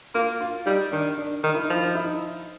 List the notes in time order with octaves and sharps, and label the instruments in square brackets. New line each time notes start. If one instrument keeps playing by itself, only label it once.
[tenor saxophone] A#3 [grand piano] F4
[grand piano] F4
[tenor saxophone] G3 [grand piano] D#4
[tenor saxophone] D#3 [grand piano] D4
[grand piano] D4
[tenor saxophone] D#3 [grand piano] D#4
[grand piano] E4
D#4
[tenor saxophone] F3 [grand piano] E4
[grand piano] D#4
E4
D#4